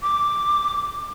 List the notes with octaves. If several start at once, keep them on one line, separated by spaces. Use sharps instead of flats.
D6